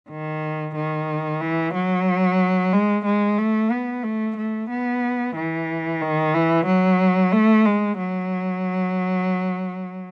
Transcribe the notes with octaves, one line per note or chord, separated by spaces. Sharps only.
D#3
D#3
E3
F#3
G#3
G#3
A3
B3
A3
A3
B3
E3
D#3
E3
F#3
A3
G#3
F#3